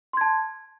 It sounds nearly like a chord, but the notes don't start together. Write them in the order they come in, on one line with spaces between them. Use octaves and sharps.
C6 G#6 A5